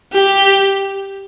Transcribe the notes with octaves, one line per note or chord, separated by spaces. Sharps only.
G4